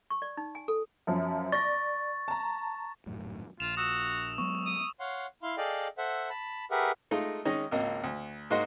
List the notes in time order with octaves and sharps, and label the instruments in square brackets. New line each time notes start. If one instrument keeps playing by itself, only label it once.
[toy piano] C#6
D5
D#4
G#5
A4
[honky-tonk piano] F#2 F3
[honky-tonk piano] D5 A#6 [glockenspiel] C#6 A6
[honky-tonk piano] A5 A#5
[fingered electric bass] D#1 F#2 A2
[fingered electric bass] A#1 [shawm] F4 [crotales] E7 F7
[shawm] F#4 [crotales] D#6 E6 E7
[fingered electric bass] F#3 G#3 B3 [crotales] C#6
[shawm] D#6
[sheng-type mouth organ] C#5 F5 F#5 C6
E4 F5 C6
G#4 A4 D5 D#5 F5 G5
A4 C5 E5 F#5
A5 B5
G4 G#4 A#4 B4 E5 F#5
[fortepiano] G#3 A3 D#4 F4
D#3 G#3 C#4 D#4
G#1 C#2 A#3 D#5
D2
G#2 A#3 F#4 D#5 C6